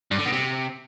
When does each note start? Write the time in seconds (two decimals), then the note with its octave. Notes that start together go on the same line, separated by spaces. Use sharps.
0.11 G2
0.18 D3
0.25 B2
0.32 C3